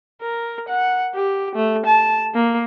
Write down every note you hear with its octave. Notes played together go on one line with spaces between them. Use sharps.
A#4
F#5
G4
A3
A5
A#3